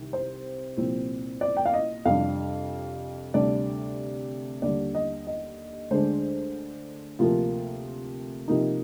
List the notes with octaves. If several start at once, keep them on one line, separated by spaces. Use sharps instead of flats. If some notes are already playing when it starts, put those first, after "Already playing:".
Already playing: C2 C3 D#3
C5
C2 A#2 F3 C4
D5
G5
F5
D#5
F2 C3 G3 D4 F5
D2 C3 G3 D4 D5
D#2 D3 G3 D5
D#5
D#5
D2 D3 G#3 D4 C5
D2 C3 F3 A#3 F4
C3 F3 A#3 D#4